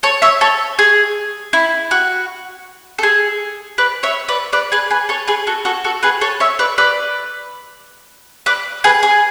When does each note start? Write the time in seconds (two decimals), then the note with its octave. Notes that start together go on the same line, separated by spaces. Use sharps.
0.03 A4 C#5
0.22 C#5 E5
0.41 A4 C#5
0.79 G#4
1.53 E4
1.91 F#4
2.98 A4
3.03 G#4
3.78 B4 D5
4.03 C#5 E5
4.29 B4 D5
4.53 B4 D5
4.72 G#4 B4
4.90 G#4 B4
5.09 A4 C#5
5.27 G#4 B4
5.47 F#4 A4
5.65 F#4 A4
5.84 F#4 A4
6.03 G#4 B4
6.21 A4 C#5
6.40 C#5 E5
6.59 B4 D5
6.78 B4 D5
8.46 B4 D5
8.84 G#4 B4
9.03 G#4